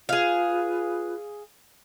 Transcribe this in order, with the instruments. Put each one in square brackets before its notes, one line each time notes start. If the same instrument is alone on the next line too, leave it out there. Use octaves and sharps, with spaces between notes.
[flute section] F4 B4 [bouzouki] G#4 F5